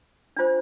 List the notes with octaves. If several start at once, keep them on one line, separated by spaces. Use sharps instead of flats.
D4 F4 C5